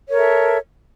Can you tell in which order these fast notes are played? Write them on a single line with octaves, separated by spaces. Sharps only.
C#5 A#4 A4 E5